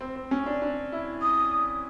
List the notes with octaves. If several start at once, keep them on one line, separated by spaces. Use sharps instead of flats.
C4
C4
C#4
D4
D4
E4
D#6